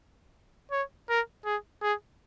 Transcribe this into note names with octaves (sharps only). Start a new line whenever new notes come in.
C#5
A#4
G#4
G#4